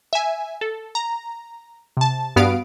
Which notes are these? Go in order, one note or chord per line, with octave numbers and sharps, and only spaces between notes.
E5 G#5
A4
A#5
C3 A5
G2 B3 F#4 F5 D#6 D7